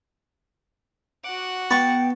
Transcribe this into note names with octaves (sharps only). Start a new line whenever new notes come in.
F#4 F#5 D6
B3 G5 A5 C#6